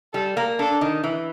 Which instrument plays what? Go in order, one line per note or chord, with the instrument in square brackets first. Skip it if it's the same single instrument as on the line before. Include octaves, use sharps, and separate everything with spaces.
[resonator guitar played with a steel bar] G3 [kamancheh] A4
[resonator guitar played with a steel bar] A#3
[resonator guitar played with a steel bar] D4 [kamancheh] A4
[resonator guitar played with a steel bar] D#3
E3